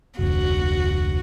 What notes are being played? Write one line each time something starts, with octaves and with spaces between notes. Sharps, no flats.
F1 D2 F#4